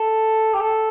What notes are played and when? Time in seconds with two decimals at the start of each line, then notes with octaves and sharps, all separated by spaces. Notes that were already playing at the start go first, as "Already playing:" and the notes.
Already playing: A4
0.54 G4
0.60 A4